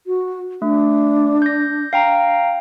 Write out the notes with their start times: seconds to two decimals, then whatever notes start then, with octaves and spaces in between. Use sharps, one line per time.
0.07 F#4
0.62 A3 D4
1.42 G6 A#6
1.93 F5 G5 A#5